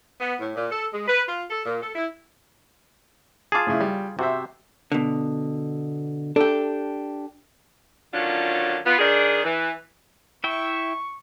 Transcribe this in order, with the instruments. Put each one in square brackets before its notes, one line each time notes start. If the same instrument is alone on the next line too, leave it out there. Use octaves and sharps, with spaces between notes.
[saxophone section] B3
A2
A#2
A4
G#3
B4
F4
A4
A#2
A4
E4
[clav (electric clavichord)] F4 G#4 [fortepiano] A5 D6
[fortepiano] A2 C#3 E4
G3
[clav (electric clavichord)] C3 [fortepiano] F#4 C5 E5
[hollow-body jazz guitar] B2 D3
[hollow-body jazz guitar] D4 G4 [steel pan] A4
[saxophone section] D3 D#3 F#3 C#4 D4 F4
B3 F4
D#3 D4 G#4
E3
[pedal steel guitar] E4 E5 G5 [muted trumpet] C#6